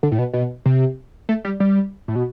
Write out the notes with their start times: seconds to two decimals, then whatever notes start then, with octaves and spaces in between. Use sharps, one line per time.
0.03 D3
0.12 A2
0.19 B2
0.33 B2
0.66 C3
1.29 A3
1.45 G3
1.60 G3
2.08 A2
2.16 B2